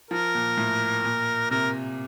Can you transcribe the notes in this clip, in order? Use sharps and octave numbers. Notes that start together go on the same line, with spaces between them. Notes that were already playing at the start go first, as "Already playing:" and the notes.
F3 A#4
A#2
A2
A#2
C3 A#4